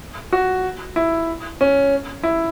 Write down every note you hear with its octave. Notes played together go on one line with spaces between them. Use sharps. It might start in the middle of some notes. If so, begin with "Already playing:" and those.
F#4
E4
C#4
E4